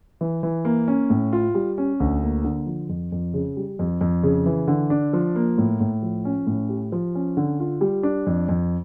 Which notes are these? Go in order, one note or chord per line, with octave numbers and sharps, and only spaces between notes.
E3
E3
A#3
C#4
A2
F4
G3
C#4
D2
A#3
D3
F3
F2
F2
C#3
G3
F2
F2
C#3
E3
D3
D4
F3
A#3
A2
A2
F3
C#4
A2
G4
F3
C#4
D3
F4
G3
D4
F2
F2